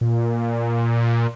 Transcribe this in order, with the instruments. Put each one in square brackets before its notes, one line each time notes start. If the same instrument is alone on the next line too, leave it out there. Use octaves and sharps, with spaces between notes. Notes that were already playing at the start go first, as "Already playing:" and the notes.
[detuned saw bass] A#2